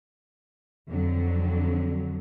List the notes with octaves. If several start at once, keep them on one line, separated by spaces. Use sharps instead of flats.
F2 D3 F#3